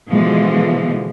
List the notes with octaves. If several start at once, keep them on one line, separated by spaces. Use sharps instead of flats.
B2 D3 E3 F3 G#3